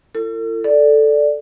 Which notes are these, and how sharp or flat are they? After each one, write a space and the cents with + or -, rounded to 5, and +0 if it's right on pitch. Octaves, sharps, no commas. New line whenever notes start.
E4 +45 A4 +40
A4 +0 D5 +0